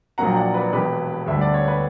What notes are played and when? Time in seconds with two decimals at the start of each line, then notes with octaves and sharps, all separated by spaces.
0.18 A#1 A#2 F#3 A#3 F#5 A#5
0.30 G5
0.36 D5 F#5
0.54 B4 D5
0.73 E1 E2 B2 G4 B4
1.26 D2 D3 G3 E5
1.41 D5
1.54 C#5
1.68 B4